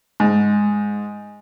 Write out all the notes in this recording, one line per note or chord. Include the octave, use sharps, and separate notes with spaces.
G#2